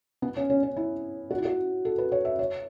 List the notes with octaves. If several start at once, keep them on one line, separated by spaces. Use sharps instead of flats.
B3
C#4
C#4
C#4
E4
F#4
E4
F#4
A4
B4
C#5
E5
C#5